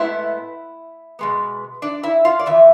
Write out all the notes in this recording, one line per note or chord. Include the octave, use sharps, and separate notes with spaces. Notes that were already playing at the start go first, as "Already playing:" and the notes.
Already playing: A2 G#3 B3 E4 E5
B2 G#3 B3
D4 D5
E4 E5
F4 F5
D5
F2 E3 E5